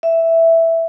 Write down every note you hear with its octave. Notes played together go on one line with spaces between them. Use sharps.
E5